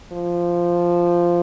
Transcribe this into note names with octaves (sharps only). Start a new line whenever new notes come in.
F3